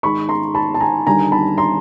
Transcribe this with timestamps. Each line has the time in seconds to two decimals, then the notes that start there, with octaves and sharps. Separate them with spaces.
0.03 G#2 D#3 G#3 B5 C#6
0.29 A#5 C6
0.55 A5 B5
0.74 A5
0.80 G#5 A#5
1.06 D#2 D3 G3 G#5 A#5
1.32 A5 B5
1.58 A#5 C6